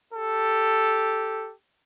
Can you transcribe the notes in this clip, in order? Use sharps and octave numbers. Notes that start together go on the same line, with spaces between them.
G4 A4